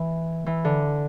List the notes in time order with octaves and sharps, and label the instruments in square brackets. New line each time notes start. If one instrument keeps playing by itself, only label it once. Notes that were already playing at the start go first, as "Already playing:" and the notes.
Already playing: [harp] E3
E3
D3